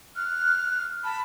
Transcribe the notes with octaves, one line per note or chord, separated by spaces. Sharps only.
F6 F#6
A5 B5